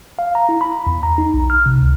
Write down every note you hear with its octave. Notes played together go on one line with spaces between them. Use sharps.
F5
A#5
E4
B5
E2
A#5
D#4
B1
F6
C3
C#2